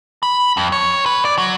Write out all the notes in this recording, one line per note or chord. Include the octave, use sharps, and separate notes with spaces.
B5
F2
C#5
B4
D5
F#3